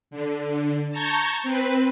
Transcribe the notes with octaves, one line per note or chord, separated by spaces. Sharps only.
D3
A5 A#5 C#6 G6 G#6
C4 B4